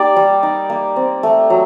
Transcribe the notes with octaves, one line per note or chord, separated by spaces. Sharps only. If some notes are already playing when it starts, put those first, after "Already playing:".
Already playing: A#3 D#4 G4 D5
G3
D#4
A#3
C4
A3
F#3